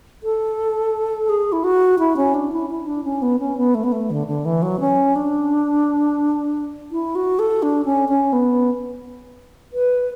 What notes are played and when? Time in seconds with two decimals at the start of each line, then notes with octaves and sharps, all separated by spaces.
0.23 A4
1.29 G#4
1.52 E4
1.64 F#4
1.99 E4
2.17 C#4
2.34 D4
2.52 E4
2.70 E4
2.87 D4
3.04 C#4
3.22 B3
3.40 C#4
3.57 B3
3.75 A3
3.84 B3
3.92 A3
4.10 D3
4.27 D3
4.45 E3
4.62 F#3
4.80 C#4
5.16 D4
6.92 E4
7.15 F#4
7.39 A4
7.63 D4
7.85 C#4
8.09 C#4
8.33 B3
9.73 B4